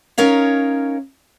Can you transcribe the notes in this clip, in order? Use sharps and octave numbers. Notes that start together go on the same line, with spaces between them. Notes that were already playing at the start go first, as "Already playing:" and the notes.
C#4 D#4 A#4 C#5 F5